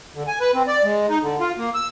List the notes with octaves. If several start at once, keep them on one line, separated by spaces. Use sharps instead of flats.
D3
G#5
B4
C4
D5
G#3
D#4
D3
F4
A#3
E6